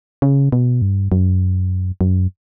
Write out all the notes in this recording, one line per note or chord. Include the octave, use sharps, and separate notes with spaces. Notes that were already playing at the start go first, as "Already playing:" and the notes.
C#3
B2
G2
F#2
F#2